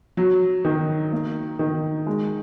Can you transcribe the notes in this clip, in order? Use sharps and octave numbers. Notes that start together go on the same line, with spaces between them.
F#3
D#3
A#3
D#3
G#3